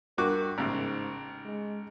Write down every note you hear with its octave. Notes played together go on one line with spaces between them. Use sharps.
G2 F#4 A#4 D6
A1 G#2 C#3
G#3